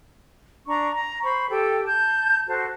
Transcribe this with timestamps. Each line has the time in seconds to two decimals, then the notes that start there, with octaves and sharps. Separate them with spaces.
0.67 D4 A#5 C#6
0.92 A#5
1.23 C5 B5 C#6
1.49 G4 A4 G5
1.85 A5 G6
2.47 F#4 A4 C5 A5